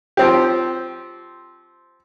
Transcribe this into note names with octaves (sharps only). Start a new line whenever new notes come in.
F3 C4 G4